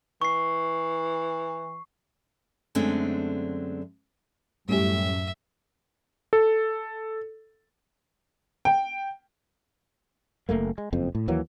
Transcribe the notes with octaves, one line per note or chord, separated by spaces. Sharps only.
E3 C#6 C7
F#2 D3 G#3 A3 C4 D4
F#2 A2 G3 A3 C#4 G4 E5
A4
G5
F#1 G#2 A3 A#3
G#3
F#1 F2 C4
A2
D#2 E3 F#3 A#3